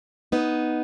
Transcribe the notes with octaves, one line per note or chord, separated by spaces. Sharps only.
B3 D#4